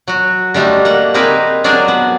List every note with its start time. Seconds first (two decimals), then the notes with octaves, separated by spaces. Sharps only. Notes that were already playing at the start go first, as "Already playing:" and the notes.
0.08 F#3 F#4
0.54 D3 G3 A3 D4 D#4
0.85 A#3 F#5
1.14 C4 D#4 G#4 A#4 B4
1.64 F#3 D4 G#4 A#4 C5 D5
1.88 B3